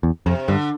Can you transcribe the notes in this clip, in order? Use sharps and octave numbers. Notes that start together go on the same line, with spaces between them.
E2
F2 C3
G2 D3